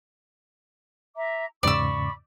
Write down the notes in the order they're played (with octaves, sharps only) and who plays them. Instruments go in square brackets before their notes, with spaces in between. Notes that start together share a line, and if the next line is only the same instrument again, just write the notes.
[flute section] E5 A#5 D6
[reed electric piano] E2 G#2 C#3 [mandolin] D5 E6 [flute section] B5 C#6 D6